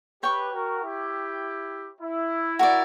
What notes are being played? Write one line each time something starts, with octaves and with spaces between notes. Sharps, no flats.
G4 B4 C#5 G5 C#6
F#4 A#4
E4 G4
E4
F#4 A#4 D5